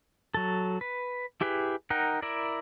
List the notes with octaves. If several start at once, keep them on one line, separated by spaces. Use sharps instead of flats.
F#3 A4
B4
E4 G4 G#4 B4
D#4 A#4 F#5 G5
E4 A#4 D5